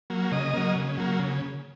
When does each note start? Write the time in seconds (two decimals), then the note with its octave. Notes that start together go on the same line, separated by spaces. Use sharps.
0.10 F#3 A#3
0.32 C#3 D#5
0.53 F#3 A#3
0.75 C#3
0.97 F#3 A#3
1.19 C#3